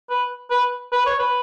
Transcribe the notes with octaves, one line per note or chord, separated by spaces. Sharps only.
B4
B4
B4
C#5
B4